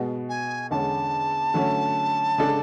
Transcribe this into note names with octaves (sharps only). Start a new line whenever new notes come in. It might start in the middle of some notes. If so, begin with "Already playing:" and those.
Already playing: B2 G#3 B3 F#4
G#5
E2 D3 G#3 C#4 A5
D3 F#3 A3 C#4
C#3 G#3 D4 A4